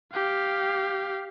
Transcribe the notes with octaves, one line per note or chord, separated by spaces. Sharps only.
G4 F5